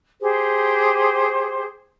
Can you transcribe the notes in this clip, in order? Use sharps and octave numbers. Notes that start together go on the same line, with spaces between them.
G4 G#4 C5